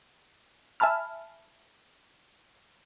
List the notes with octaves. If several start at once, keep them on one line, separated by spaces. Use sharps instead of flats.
E5 G#5 A5 B5 F6